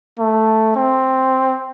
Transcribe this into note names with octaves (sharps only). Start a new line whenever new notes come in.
A3
C4